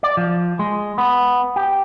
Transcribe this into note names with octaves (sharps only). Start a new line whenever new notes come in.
D5
F3
G#3
B3
G4